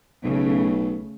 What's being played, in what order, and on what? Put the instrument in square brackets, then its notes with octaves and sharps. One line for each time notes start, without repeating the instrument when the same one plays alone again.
[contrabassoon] B1 [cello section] C#3 A3